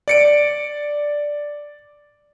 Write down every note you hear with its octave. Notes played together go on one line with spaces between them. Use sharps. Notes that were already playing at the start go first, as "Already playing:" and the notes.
D5 C#7 D7